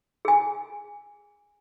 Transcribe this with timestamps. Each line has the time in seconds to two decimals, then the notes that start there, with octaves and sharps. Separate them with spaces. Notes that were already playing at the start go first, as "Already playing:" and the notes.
0.25 G#4 G#5